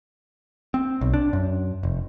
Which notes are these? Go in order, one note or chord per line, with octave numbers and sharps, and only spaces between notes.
C4
B1
D4
F#2
F1